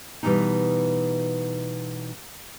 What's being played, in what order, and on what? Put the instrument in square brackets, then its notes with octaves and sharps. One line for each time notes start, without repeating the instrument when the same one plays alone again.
[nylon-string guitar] B2 E3 G3 A3 C4 D#4